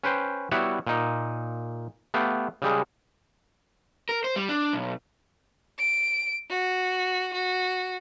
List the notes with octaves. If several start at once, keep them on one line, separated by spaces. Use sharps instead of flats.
C#4 B4 C5 G5
G3 B3 E4 F#4 C#5 E5
A#2 D#4
A3 B3 G4 F5
C#3 G3 G#3
A#4
C5
G3
D4
B1
D7
F#4
F#4